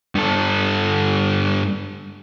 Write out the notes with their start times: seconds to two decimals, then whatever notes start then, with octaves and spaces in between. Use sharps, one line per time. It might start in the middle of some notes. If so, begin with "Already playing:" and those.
0.15 G2 A4